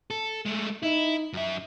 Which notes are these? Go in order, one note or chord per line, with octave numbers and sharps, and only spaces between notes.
A4
G#3 A3
D#4 E4
F#2 E5